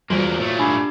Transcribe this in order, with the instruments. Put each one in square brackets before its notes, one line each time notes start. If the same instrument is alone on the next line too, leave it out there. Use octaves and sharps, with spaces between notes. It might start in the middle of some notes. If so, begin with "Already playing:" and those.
[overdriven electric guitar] E2 A#3 [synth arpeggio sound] E3 G3 G#3 [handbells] F4 F#4 C5
[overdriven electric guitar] A#2 A3 [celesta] C#5
[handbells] D4 G4 [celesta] G#5 B5 G#6